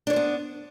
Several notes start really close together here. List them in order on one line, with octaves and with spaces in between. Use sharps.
D4 C#5 C5 B3